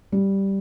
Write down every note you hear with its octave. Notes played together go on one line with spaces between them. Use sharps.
G3